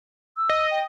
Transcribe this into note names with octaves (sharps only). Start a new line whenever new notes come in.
E6
D#5
G5